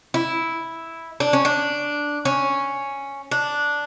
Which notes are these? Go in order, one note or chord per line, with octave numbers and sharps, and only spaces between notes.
E4
D4
C#4
D4
C#4
D4